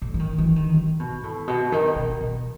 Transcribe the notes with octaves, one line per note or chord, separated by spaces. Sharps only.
A2
E3
D#3
E3
D#3
D#3
B2
A2
B2
D#3
B2
B2